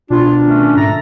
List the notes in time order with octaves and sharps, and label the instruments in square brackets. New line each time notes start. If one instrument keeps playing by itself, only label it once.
[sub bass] B2 [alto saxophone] D4 [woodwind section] F4
[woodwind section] D#3 A3 C#4
[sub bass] G#2 [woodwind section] A4 E5 A#5